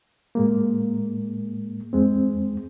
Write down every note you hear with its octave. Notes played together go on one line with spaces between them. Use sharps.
A2 G#3 A#3
E2 G#3 C4